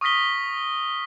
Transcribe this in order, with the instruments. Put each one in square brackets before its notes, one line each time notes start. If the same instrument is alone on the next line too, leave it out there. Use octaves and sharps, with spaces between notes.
[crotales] C#6 D#6 F6 A#6 B6 G7